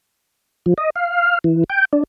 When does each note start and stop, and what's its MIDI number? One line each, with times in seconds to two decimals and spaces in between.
0.66 0.74 53
0.78 0.90 75
0.96 1.39 77
1.44 1.64 52
1.70 1.85 79
1.93 2.03 62